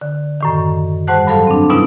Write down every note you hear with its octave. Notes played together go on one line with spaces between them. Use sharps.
D3
F#2 A2 D#3
G#2 G3 C5 F#5 A5 F#6
G2 F#3 A4 F5 A5
C4 D4
B2 G3 B3 C#4 D#4 E4